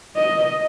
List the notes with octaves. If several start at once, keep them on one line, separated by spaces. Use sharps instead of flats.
D#5